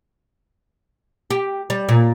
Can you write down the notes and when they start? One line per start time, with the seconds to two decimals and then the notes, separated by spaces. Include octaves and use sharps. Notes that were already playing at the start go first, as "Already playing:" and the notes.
1.30 G4
1.70 G3
1.89 A#2